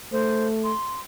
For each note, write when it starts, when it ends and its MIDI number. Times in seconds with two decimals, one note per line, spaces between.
0.12 0.72 57
0.12 0.47 72
0.64 1.00 84